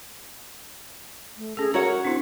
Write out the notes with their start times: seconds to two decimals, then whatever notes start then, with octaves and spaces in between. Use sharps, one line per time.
1.37 A3
1.57 C#4 G#4 A4
1.74 F#4 A#4 C#5 F#5 A#5
2.05 C4 D4 E4